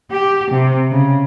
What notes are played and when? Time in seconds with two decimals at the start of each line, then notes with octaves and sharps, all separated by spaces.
0.11 G4
0.51 C3
0.91 C#3